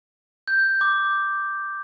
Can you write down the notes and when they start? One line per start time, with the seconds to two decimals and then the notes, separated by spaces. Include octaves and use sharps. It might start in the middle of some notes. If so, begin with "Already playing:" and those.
0.48 G6
0.81 D6